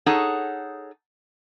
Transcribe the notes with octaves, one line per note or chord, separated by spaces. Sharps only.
D#4 G#4 A4 C#5 F#5